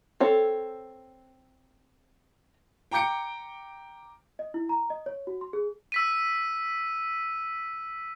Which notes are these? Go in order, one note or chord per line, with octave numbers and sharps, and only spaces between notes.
C4 A4 C#5
G5 A#5 D6 G6 C#7 D7
D#5
E4
A#5
D#5
C#5
F#4
C6
G#4
E6 B6 D#7